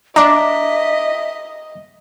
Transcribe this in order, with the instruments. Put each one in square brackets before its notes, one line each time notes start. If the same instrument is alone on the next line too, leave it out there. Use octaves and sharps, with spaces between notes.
[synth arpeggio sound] D4 [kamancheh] D#5 [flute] E5 [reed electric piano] A#5 D6